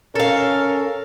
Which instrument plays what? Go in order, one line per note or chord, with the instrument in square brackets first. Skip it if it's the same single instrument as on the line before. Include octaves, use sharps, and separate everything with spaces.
[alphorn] C#4 [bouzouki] A4 F5 [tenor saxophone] A#4